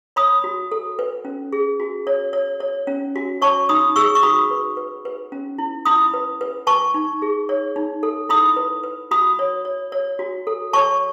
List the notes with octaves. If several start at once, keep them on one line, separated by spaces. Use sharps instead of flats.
C#5 B5 D#6
F#4
A4
B4
C#4
G#4
F#4
C#5
C#5
C#5
C#4
F#4
C#5 A5 C#6
D#4 B5 D#6
G#4 C#6 E6
C#6
F#4 B5 D#6
B4
B4
B4
C#4
E4
E4 B5 D#6
B4
B4
B4 A5 C#6
D#4
G#4
C#5
D#4
A4
E4 B5 D#6
B4
B4
F#4 B5 D#6
C#5
C#5
C#5
F#4
A4
C#5 A5 C#6